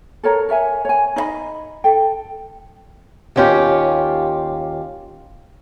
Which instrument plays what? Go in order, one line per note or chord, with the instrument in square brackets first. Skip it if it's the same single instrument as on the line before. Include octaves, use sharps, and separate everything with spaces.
[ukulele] A4 A#4 C#5 A#5
A#4 C#5 E5 G#5
C#5 G#5
D#4 C#5 D#5 B5
A4 G5
[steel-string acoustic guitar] D#2 A#3 C#4 F4 G4